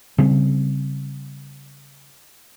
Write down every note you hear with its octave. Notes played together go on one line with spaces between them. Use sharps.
C#3 G3 C4